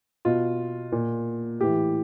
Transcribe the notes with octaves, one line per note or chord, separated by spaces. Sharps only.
B2 F4
A#2
A2 E3 G4